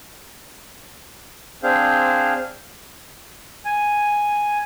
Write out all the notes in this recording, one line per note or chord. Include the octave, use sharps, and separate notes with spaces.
C4 D4 G#4 C5 F5
G#5